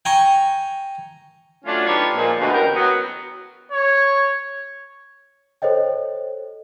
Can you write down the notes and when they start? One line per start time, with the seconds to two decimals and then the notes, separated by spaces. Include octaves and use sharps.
0.05 G5 G#5 A#5 C#6
1.65 F#3 A3 C#4 D4 F4
1.86 D4 D#4 F4 G4 B4 C#5
2.14 A#2 F3 G#3
2.39 D2 B2
2.53 E2 C#4 G4 A#4
2.74 F#3 B3
3.72 C#5
5.62 A4 C5 C#5 D#5 G5